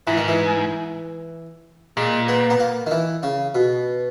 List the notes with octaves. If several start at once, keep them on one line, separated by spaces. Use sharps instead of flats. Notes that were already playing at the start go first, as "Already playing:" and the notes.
G#2 E3
D#3
E3
A#2 G#3
B3
B3
A#3
D#3
E3
C#3
B2